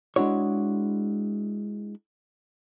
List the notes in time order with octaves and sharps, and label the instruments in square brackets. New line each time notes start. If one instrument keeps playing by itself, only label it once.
[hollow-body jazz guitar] G#3 D4 E4 F#4 C#5